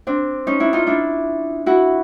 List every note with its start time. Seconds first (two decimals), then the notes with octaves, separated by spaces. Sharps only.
0.07 C4 D4
0.47 C#4 D#4
0.60 D4 E4
0.73 D#4 F4
0.87 D4 E4
1.66 E4 F#4